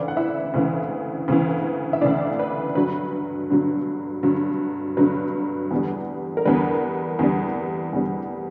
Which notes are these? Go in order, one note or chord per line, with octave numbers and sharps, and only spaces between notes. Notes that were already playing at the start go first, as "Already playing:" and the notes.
Already playing: D2 C#3 E3 D4 D5
F#5
E4 E5
D2 C#3 E3
D2 C#3 E3
E5
D2 C#3 E3 D4 D5
B4
G2 D3 F#3 B4
G2 D3 F#3
G2 D3 F#3
G2 D3 F#3 B4
E2 D3 G3
A#4
E2 D3 G3 B4
E2 D3 G3
E2 D3 G3